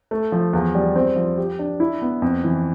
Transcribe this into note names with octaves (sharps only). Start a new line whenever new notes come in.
A3
F3
E2
G3
C4
F3
G4
D4
E4
B3
F2
E3